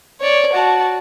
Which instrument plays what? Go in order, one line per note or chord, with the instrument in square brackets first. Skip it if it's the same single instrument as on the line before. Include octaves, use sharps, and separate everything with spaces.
[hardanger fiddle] C#5 D5
F#4 A5